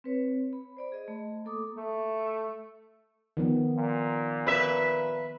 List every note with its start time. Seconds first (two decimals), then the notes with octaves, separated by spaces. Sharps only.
0.04 C4 B4 C#5
0.53 B5
0.77 C5 D5 B5
0.92 G#4 D#5
1.08 A3
1.45 A#3 A4 D6 D#6
1.77 A3
3.37 D#3 F3 B3
3.76 A#2
4.47 B4 E5